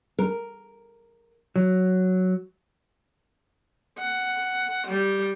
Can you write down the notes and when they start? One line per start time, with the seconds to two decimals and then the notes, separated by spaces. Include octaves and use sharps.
0.19 A#4
1.56 F#3
3.98 F#5
4.88 G3